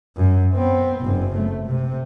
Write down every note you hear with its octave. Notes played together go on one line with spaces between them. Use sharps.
F#2
B3 C4
F#1 F#2
A3
C3